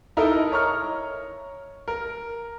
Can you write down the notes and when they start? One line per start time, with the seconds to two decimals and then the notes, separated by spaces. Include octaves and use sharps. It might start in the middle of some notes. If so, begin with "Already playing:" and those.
0.17 D#4 E4 A4 A#4 D#5
0.52 C#5 A#5 C#6 F6
1.88 A#4